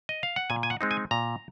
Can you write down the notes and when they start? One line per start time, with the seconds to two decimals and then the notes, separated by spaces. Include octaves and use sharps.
0.09 D#5
0.23 F5
0.36 F#5
0.50 A#2 G#5
0.63 G#5
0.70 F#5
0.81 G#3 C4 D#4
0.91 G#5
1.11 A#2 A#5